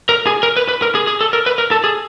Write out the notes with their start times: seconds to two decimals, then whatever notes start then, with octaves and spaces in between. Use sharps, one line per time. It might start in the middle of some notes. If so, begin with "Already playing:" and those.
0.09 A#4
0.27 G#4
0.43 A#4
0.57 B4
0.69 B4
0.82 A#4
0.95 G#4
1.07 G#4
1.21 A4
1.33 A#4
1.46 B4
1.58 A#4
1.71 A4
1.84 G#4